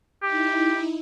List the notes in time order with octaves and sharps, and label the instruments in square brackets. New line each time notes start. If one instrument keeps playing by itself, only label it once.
[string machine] D#4 E4 [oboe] G4